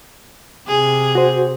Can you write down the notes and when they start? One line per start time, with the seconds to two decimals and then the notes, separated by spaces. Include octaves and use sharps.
0.68 C3 G#4
1.15 F#4 C5